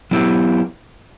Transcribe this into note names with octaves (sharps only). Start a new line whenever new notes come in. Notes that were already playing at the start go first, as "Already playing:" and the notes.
F#3 B3 E4 G4